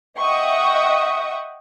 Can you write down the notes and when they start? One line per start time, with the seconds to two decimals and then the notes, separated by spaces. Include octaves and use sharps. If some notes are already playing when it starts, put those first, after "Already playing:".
0.20 D#5 E5 F#5 G5 C#6 D#6